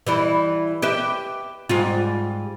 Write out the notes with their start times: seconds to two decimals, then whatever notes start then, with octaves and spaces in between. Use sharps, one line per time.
0.07 E3 G3 E4
0.82 G4 B4 E5
1.69 G#2 G3 F4